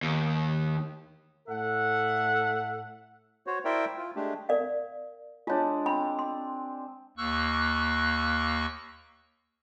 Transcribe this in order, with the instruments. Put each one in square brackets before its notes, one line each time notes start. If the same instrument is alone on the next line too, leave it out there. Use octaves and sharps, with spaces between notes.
[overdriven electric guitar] D#2
[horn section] A2 A4 E5 F#5
[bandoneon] F#4 C5 C#5
E4 A#4 C5 D5 E5 G5
F4
G#3 A3 D4 G4
[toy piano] A#4 D5 F5
[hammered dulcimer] G#3 D4 [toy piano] F4 C#5
[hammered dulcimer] C4 [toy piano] B5
[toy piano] C6
[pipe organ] D#2 A#3 C#6 E6 F#6